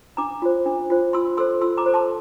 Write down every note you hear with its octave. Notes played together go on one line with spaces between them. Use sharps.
D4 A#5 D6
F4 C5
D4
F4 C5
F4 C6 E6
A4 C5 C6 E6
F4 C6 E6
A#5 D6
A4 C5
A5 C6